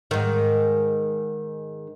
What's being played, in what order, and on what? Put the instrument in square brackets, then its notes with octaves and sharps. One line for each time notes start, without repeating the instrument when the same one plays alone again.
[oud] G#2 D#3